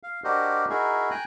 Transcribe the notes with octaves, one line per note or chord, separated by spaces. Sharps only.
F5
D4 F#4 G4 A#4 C5 D#5
D#4 E4 F#4 G#4 A#4
G5 G#5 A#5 F#6